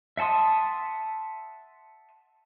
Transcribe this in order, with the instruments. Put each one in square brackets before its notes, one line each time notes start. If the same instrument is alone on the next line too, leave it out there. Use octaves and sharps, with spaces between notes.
[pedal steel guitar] E5 F#5 A5 C6 D#6